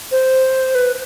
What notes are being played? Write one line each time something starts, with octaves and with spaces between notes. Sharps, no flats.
C5
B4